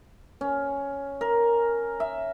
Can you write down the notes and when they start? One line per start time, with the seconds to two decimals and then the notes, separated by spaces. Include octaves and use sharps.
0.41 C#4
1.21 A#4
2.00 E5